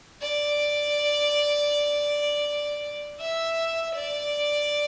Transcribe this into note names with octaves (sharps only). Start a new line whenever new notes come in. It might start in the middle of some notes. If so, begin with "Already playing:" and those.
D5
E5
D5